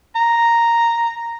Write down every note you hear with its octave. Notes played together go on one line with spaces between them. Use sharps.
A#5